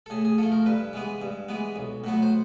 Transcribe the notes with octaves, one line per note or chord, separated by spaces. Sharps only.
A4
A2 G#4
G#4
F3 A3 A4
A#4
G2 B4
E3 G#3 B3
G2
E3 G#3 B3
B1
A2 F#3 B3
C5